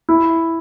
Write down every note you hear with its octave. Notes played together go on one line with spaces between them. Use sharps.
E4